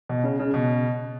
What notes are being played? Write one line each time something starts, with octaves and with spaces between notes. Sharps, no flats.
B2
C#3
C#3
B2